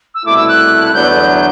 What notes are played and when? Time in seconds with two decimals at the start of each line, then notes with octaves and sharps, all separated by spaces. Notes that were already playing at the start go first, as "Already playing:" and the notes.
0.15 E6
0.25 C2 B2 A3 E4 D6
0.37 E6
0.48 F#6
0.94 E2 D3 F#3 B3 D4 G6